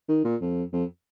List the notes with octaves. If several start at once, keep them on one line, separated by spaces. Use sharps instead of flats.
D#3
A#2
F2
F2